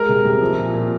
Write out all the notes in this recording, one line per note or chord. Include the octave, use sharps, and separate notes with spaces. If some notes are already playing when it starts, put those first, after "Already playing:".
Already playing: G#3 A#4
C3
C3
F3
A#2
A#2